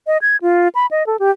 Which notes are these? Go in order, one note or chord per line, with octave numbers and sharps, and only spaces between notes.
D#5
G#6
F4
B5
D#5
A4
G4